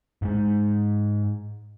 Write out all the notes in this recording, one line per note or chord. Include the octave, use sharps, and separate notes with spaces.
G#2 G#3